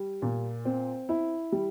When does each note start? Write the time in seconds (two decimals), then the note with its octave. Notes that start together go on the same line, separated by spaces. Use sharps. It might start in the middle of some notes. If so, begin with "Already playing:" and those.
Already playing: G3
0.22 A#2
0.65 C4
1.09 E4
1.52 G3